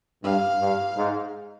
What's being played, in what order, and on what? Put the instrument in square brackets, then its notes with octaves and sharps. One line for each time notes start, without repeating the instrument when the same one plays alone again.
[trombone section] G2 [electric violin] F5
[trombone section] G2
G#2